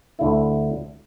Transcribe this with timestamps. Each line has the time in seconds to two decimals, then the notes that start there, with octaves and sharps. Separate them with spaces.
0.19 D2 D3 A3 E4